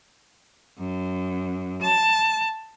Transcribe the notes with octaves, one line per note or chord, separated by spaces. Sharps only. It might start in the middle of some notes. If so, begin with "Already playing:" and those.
F#2
A5